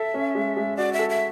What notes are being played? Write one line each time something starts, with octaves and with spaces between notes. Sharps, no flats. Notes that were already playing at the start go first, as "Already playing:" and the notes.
Already playing: A4 E5
C#4
G#3
G#3
F#4 D5
E5
A4
E5